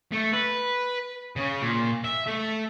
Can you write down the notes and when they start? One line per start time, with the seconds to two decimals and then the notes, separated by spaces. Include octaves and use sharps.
0.13 A3
0.33 B4
1.36 C#3
1.62 A#2
2.04 E5
2.26 A3